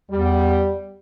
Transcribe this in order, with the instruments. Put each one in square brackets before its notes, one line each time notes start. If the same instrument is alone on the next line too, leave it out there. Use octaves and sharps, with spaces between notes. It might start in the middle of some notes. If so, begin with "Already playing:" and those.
[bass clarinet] E2 [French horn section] G3